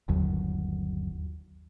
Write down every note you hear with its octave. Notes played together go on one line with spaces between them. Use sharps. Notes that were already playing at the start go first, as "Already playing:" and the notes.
G1 D#2 F#3